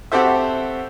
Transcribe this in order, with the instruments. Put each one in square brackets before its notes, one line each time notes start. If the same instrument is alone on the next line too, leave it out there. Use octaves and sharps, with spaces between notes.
[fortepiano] C4 F#4 G4 A4 C5 E5